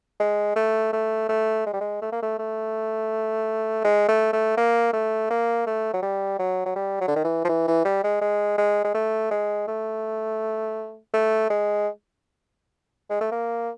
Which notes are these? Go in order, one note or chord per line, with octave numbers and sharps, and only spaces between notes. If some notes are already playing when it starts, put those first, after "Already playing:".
G#3
A3
A3
A3
G#3
G3
G#3
A3
A#3
A3
A3
G#3
A3
A3
A#3
A3
A#3
A3
F#3
G3
F#3
F#3
G3
F#3
D3
D#3
E3
F3
E3
E3
G3
G#3
G#3
G#3
G#3
A3
G#3
A3
A3
G#3
G#3
A3
A#3